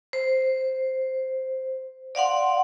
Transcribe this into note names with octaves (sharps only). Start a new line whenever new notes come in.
C5
D5 F5 F#5 C6